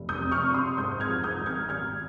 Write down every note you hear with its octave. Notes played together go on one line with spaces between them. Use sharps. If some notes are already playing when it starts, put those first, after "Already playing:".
Already playing: F1
D#6 G6
F2
C#6 F6
C3
C6 D#6
G#2 D#6 G6
F6 G#6
F3
D#6 G6
G#1
F6 G#6
G#1 F6 G#6